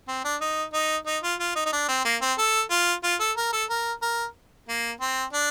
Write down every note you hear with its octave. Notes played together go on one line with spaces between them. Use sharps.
C4
D4
D#4
D#4
D#4
F4
F4
D#4
D#4
D4
C4
A#3
C4
A4
F4
F4
A4
A#4
A4
A#4
A#4
A#3
C4
D4